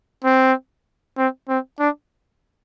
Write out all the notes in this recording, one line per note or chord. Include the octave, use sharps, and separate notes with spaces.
C4
C4
C4
D4